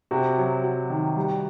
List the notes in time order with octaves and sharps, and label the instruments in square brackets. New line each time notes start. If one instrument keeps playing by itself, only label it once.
[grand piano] C3 [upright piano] F#4
[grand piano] F#3
F#3
D#3
G3